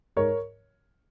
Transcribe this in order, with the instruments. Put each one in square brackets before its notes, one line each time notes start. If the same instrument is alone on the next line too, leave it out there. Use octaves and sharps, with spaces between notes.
[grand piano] G#2 A#4 C#5